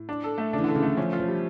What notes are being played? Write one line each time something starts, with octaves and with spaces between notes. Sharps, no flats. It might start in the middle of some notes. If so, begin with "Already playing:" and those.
Already playing: A2
D4
A4
A3
C#3 D4
E3
D3
A4
C#3
E3 A3
F3 C#4
F4
F3
G3